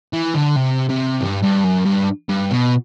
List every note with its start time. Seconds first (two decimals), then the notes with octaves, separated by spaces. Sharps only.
0.13 E3
0.35 D3
0.56 C3
0.89 C3
1.21 G2
1.43 G2
1.64 F#2
1.85 G2
2.29 G2
2.51 B2